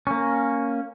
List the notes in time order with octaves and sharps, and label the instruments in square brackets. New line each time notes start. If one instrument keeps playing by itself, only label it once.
[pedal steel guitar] A#3 C#4